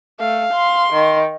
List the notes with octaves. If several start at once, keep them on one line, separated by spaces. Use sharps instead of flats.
A3 F5
C6
D#3